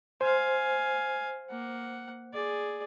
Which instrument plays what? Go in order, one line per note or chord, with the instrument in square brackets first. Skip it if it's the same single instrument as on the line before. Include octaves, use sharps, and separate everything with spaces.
[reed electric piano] C5 [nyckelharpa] F5 G#5
[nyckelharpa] A#3 F#5
G#4 D5